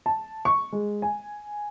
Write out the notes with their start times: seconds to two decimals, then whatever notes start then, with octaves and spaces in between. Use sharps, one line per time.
0.06 A5
0.45 C#6
0.72 G#3
1.02 G#5